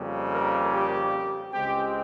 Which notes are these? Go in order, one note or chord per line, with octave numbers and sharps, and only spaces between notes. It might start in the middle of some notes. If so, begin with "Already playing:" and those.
Already playing: F2 C#3 G3 A#3
A#4
G4
C#2 C#3 G#3 C4 G4